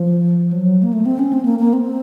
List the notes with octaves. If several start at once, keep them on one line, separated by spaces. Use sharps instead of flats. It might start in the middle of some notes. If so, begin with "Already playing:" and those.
Already playing: F3
F#3
A#3
A3
C4
C#4
C4
A#3
A#3
C4